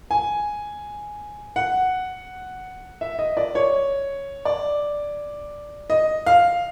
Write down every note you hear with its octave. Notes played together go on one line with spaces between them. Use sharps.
G#5
F#5
E5
D#5
D5
C#5
D5
D#5
F5